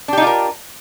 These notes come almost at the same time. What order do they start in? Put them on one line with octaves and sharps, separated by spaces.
D4 G4 D#4 F4 A#4